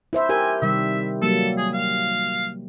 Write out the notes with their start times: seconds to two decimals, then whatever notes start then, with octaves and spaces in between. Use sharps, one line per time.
0.13 E4 C5 E5
0.29 G4 A#4 E5 G#5
0.62 C3 D#3 G3 E5
1.22 F#3 G3 A#3 A4
1.57 G#4
1.74 F5